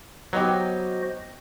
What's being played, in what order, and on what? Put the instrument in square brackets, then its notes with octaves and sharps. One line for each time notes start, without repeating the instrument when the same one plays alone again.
[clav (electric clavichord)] F#3 [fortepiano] B3 D#4 G4 [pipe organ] F#4 C5 D#5